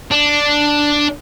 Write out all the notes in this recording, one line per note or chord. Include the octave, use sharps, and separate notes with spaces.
D4